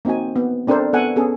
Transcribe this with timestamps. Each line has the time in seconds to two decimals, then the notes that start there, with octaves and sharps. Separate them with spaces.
0.05 A#3 C4 D#4 F#4 G#5
0.36 B3
0.67 C4 D4 A4 A#4 C5 D5
0.93 B3 A4 F#5 G#5
1.16 B3 C#4 G#4 A4